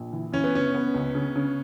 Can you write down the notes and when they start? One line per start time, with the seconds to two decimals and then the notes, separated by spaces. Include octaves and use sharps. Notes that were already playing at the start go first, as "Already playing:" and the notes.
Already playing: A#1
0.12 E3
0.32 E3 C#4
0.44 B3
0.54 C#3 C#4
0.74 B3
0.94 C#2
1.15 C#3
1.35 C#3